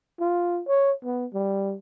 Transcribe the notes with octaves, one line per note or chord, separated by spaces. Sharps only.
F4
C#5
B3
G3